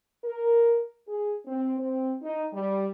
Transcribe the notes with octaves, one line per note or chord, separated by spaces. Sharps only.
A#4
G#4
C4
C4
D#4
G3